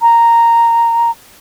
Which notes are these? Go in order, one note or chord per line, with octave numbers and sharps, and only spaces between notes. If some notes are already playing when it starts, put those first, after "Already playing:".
A#5